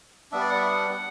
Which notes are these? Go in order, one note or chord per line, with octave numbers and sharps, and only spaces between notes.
G3 B3 D4 E5
D5
F#5
E5
F#5